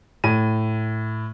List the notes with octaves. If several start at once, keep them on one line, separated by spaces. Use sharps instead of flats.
A2 D#7